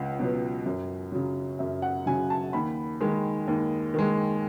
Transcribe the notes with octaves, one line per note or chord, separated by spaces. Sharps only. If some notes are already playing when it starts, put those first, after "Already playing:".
Already playing: C#2 F#5
B2 F#3 B3
F#2
C#3 F#3
F#2 E5
F#5
C#3 F#3 G#5
A5
D#2 B5
D#3 G#3
D#2
D#3 G#3